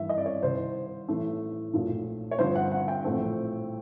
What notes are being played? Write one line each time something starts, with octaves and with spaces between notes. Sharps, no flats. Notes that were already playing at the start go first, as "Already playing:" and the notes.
Already playing: G#1 G2 E3 E5
D#5
D5
C#5
C2 C3 D#3 C5
A1 A2 E3 A3
B1 A#2 F3 A3
C#5
G2 D3 F3 C5
F#5
F#5
G5
A#1 A2 E3 A3 C4